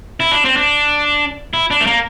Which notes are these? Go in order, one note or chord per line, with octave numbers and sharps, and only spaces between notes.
E4
D4
C4
D4
E4
D4
A3
A#3